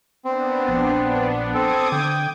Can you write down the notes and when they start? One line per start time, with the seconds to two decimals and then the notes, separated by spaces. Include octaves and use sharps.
0.25 B3 C4 D4
0.68 A#1
1.55 C4 A4 D6 D#6 G#6
1.92 D3 G5